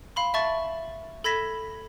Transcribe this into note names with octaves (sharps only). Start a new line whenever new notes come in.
F5 B5 C6
E5 A5 C#6 A6
A4 B5 G#6 A#6 B6 E7